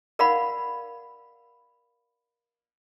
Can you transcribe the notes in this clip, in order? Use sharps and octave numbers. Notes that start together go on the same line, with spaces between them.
A#4 D5 F5 F#5 B5